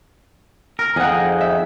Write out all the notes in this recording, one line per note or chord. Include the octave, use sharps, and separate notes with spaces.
A#4
F2 D#4 G#4 F#5
E5